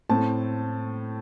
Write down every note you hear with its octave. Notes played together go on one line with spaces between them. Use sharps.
A2 A3 C4 A5